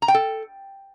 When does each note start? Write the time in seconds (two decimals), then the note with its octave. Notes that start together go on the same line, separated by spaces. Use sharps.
0.02 A#5
0.08 G5
0.14 A4